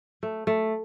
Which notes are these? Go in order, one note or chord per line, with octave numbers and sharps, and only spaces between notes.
A3
A3